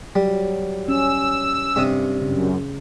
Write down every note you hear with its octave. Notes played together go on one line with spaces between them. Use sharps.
F#3 G3
C#4 E6
G2 C3 D#6
F#2 C#3